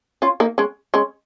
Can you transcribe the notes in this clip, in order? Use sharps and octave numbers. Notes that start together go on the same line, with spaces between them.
C#4 F4
A#3 D#4
G#3 C#4
G#3 C#4